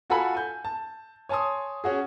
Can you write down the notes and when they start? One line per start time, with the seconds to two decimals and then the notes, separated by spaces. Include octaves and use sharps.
0.10 F4 F#4 A4 F5 G#5 B5
0.35 G#5 G6
0.65 A5
1.29 C#5 G#5 A5 C6 D#6
1.84 C#4 F#4 G#4